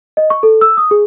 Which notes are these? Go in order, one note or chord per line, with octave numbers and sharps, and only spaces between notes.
D#5
C#6
A4
E6
D#6
G#4